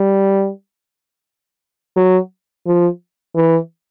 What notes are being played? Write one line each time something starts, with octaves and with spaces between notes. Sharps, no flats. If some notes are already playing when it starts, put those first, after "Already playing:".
Already playing: G3
F#3
F3
E3